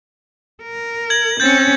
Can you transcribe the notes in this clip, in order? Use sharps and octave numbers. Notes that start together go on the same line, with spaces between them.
A#4
G#6 F#7
C4 C#4 G6 A6